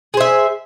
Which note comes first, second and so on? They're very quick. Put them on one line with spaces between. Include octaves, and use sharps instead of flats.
G#4 C5 E5